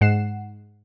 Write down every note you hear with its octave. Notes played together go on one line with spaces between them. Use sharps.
G#2 F#5 C7 E7